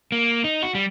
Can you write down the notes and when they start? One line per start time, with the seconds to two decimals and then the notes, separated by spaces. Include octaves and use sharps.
0.12 A#3
0.44 D#4
0.62 F#4
0.75 G3